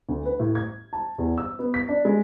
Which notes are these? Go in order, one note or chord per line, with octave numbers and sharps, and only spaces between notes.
D2
B4
A2
G#6
A5
E2
E6
B3
B6
D4
G#3